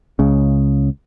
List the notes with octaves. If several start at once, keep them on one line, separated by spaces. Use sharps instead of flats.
C#2 C#3